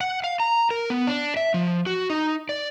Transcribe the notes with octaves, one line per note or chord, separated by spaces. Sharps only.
F#5
F5
A#5
A#4
B3
D4
E5
F3
F#4
D#4
D5